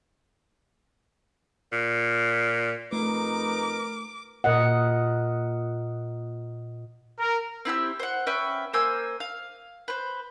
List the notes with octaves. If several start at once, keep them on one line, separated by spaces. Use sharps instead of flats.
A#2
F2 A3 D#4 A#4 B4 D6
A#2 A#4 D#5 F#5
A#4
C4 E4 G4 E6
C5 F#5
C#4 B4 E5 G5
A#3 C5 G#5 E6
F5
B4 C5